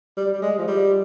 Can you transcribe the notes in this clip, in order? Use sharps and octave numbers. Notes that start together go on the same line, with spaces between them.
G3
G3
G#3
F3
G3